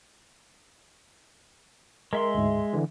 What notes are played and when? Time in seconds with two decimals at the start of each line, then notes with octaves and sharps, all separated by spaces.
2.13 G#3 A#4 E5 C6
2.34 D2 G#2
2.73 D3 E3